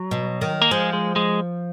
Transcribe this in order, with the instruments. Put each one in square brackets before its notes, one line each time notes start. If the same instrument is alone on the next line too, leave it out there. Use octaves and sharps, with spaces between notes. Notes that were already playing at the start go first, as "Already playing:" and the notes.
Already playing: [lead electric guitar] F#3
[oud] B2
D#3
[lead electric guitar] A#3
[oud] F3 [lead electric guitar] G#3
[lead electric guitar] G#3
G#3